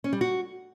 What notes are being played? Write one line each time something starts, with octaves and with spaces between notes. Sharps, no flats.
C#4
G3
F#4